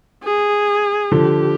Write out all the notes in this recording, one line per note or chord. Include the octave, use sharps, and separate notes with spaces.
G#4
D3 F3 G4